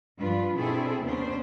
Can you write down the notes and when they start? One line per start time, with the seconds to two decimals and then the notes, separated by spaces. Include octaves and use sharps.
0.17 G2 F3 D4 F4 B4
0.56 B2 C4 D4 E4 G#4 A4
1.02 D#2 C3 B3 C#4 D4 C5